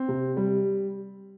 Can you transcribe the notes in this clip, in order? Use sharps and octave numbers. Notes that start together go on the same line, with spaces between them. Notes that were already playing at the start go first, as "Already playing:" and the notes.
Already playing: C4
C3
G3